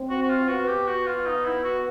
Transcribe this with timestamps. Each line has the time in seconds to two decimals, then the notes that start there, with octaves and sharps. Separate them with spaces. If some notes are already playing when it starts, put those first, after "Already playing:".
Already playing: C4
0.10 F#4
0.23 F#4
0.29 F4
0.48 B3 F#4
0.68 G4
0.87 F#4
1.07 F4
1.26 D#4
1.45 E4
1.64 F#4